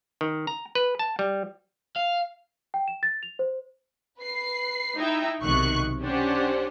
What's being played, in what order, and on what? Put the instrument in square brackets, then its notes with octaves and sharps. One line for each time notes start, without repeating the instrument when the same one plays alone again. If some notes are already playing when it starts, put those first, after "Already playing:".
[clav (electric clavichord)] D#3
A#5
B4
A5
G3
[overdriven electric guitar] F5
[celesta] G5
E7
A6
F7
C5
[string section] B4 C7
D#4 E4 E5 G5
B1 C3 D#3 C#6 F#6
C#4 D4 G4 C5 F#5